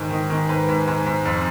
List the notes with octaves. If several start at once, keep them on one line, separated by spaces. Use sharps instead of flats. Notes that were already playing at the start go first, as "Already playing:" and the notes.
Already playing: G#2 D#3
D#3
D#3
G#2 B4
G#2
G#2
G#2
F2